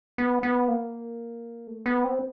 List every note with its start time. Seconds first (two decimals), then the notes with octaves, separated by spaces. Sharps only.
0.18 B3
0.43 B3
0.68 A#3
1.67 A3
1.86 B3
2.04 C4